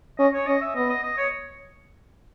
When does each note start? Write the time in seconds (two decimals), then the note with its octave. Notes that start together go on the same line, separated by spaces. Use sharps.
0.19 C#4 D#5
0.34 C#5
0.46 C#4 D#5
0.61 E5
0.76 B3 D#5
0.89 D#5
1.03 D#5
1.17 C#5